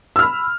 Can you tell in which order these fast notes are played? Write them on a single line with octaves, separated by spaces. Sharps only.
E6 F6 B5